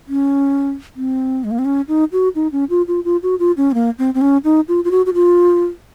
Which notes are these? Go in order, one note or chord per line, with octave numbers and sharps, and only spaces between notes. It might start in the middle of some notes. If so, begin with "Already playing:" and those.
C#4
C4
G#3
A#3
C4
C#4
D#4
F#4
D#4
C#4
F4
F4
F4
F#4
F4
C#4
C4
A#3
C4
C4
C#4
D#4
F4
F4
F#4
F#4
F4